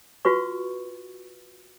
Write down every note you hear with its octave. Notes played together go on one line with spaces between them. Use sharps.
F4 F#4 B4 C#6